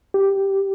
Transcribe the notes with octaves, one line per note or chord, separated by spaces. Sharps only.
G4